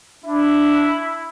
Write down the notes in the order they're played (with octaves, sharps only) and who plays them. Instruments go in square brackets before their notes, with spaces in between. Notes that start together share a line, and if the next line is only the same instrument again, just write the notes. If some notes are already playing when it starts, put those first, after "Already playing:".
[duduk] D4 [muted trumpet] E4